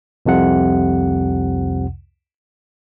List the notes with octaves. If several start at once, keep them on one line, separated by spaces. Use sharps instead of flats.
C2 F2 C3 F#5